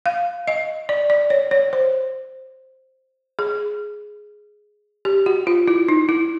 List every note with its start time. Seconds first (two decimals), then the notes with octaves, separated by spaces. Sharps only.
0.06 F5
0.47 D#5
0.89 D5
1.10 D5
1.30 C#5
1.51 C#5
1.73 C5
3.39 G#4
5.05 G4
5.26 F#4
5.47 F4
5.68 E4
5.88 D#4
6.09 E4